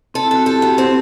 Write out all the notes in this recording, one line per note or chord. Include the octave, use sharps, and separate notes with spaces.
C4 A4
E4
F#4 A4
G4 A4
B3 F#4
C4 G4